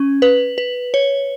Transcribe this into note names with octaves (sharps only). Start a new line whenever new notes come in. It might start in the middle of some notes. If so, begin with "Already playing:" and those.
Already playing: C#4
B4
B4
C#5